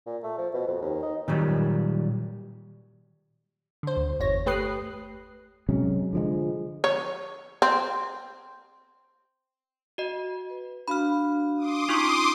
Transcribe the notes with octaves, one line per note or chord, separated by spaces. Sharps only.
A#2
A3
F3
B2
F2
D#2
D#4
A#2 D#3 F#3 G3
D3 C5
D2
G1 E2 C#5 A#6
A3 G4 B4 D#6 F#6 C7
C3 F#3 G#3 C#4
D3 F3 G#3
C#5
C4
F#4 D#5
B4
D4 F#4 F5 B5 F6
C6 D6 D#6
C#4 D#4 F4 C#6